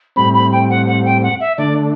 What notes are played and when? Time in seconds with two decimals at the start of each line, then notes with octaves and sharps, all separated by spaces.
0.16 A2 G3 C4 B5
0.34 B5
0.52 G5
0.70 F#5
0.87 F#5
1.05 G5
1.22 F#5
1.40 E5
1.57 D3 A3 D4 D5